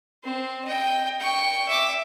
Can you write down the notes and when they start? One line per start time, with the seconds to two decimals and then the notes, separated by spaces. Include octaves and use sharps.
0.24 C4 C5
0.65 D#5 G5
1.19 G5 C#6
1.68 E5 D6